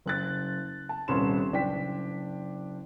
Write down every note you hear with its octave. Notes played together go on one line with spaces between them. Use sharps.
F#1 F#6 A6
A5
D#1 C2 C#4 B4 C6 E7
F#1 D4 G5 B6